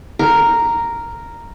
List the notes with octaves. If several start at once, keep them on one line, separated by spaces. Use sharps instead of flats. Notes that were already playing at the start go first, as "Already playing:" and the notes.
A#4